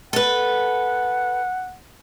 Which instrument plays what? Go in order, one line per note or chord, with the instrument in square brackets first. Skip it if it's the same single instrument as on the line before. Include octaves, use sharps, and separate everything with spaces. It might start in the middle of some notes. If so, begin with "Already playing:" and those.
[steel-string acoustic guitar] A4 B4 [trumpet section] F#5